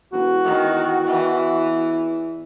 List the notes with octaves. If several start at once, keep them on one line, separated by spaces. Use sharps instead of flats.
E1 F#4
E2 D#3
E3